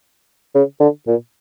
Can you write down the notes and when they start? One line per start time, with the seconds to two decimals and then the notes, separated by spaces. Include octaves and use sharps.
0.55 C#3
0.80 D3
1.07 A#2